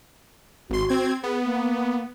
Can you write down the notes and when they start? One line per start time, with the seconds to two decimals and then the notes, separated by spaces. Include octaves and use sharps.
0.70 G#1 F#4 C6
0.89 C4 G#6
1.23 B3 G#4
1.43 A#3